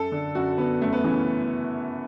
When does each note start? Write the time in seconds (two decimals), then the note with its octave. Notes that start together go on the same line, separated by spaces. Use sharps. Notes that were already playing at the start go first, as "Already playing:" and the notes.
Already playing: F#2 A4
0.12 D3
0.35 F#2 F#4
0.58 D3 B3
0.81 F#2 A3
0.93 B3
1.04 C#3 E3 C#4